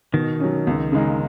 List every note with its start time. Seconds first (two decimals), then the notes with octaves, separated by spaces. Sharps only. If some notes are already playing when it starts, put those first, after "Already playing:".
0.13 B2 D#3
0.40 F#3 C#4
0.67 C#2
0.92 C#3 G#3 D#4